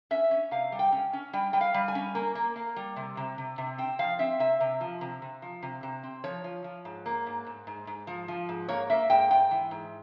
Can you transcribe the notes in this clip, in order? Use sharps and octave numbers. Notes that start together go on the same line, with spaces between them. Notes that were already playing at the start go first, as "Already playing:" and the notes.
C#4 E5
C#4
C3 F5
G3
G5
C#4
C#4
G3 G5
G3 G5
F5
G3
G#5
C#4
A#3
A#3
A#3
G3
C3
C3
C3
C3
C4 G5
F3 F5
C4 E5
C3 E5
C3
F3
C3
C3
F3
C3
C3
C4
F3 C#5
F3
F3
G#2
A#3
G#2
G#2
G#2
G#2
F3
F3
G#2
A#3 C#5
A#3 E5
G#2 G5
G#2 G5
E3
G#2